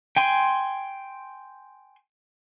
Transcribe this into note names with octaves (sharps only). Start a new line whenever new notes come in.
G5 G#5 C6